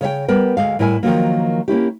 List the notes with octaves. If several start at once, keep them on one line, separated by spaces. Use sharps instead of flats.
C#3 C#5 E5 G5
G3 B3 A#4
D2 F3 G#3 F5
A2 G3 E4 A#4 E5 G#5
D#3 F3 F#3 A#3
A#3 C#4 E4 G4